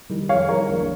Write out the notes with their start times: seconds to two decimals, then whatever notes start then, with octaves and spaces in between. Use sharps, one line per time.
0.10 D#3 G3
0.29 F2 C#5 F5
0.49 D#3 G3 A#4 C#5
0.68 A#1